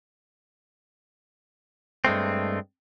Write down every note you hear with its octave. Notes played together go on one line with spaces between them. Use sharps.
G2 G#3 A3 C4